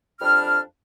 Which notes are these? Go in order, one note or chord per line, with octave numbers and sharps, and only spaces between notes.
F2 G3 D4 F6